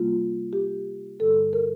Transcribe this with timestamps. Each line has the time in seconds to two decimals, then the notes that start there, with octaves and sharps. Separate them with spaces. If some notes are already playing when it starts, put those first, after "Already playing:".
Already playing: C3 G3 A#3 F4
0.53 G4
1.19 G2 D3 G3 A4
1.53 A#4